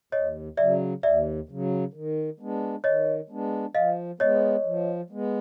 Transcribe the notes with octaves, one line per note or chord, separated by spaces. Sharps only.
D#2 C#5 D#5
C#3 F#3 D5 E5
D#2 D5 E5
C#3 F#3
D#3
G#3 B3 D4
D#3 C#5 D#5
G#3 B3 D4
F3 D#5 F5
G#3 B3 C#5 D#5
F3
G#3 B3